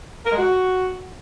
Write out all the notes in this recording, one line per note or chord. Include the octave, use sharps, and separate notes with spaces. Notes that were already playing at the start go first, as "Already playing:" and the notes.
A#4
G#3
F#4